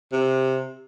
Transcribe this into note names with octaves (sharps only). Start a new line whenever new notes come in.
C3